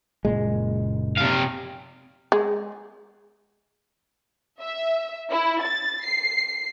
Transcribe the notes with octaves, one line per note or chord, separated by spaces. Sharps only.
F#1 A#2 G#3
C3 F5
G#3
E5
E4
A6
C7